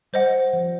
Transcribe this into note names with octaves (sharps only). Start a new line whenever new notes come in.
G3 C5 D#5 F#5
F3